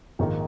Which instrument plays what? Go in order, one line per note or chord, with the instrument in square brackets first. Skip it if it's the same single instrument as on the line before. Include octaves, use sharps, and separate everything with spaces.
[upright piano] A#1 G#2 D#3 A#3 D#4